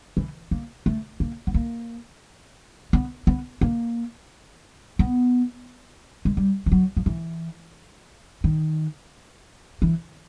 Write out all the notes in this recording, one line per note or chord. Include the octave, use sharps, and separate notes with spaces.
E3
A#3
A3
A#3
B3
A#3
B3
B3
A#3
B3
G#3
G3
F3
F#3
F3
E3
D#3
E3